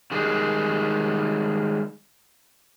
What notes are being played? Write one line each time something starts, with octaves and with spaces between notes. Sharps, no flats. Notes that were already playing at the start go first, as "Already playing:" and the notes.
D#3 G3 G#3 G#4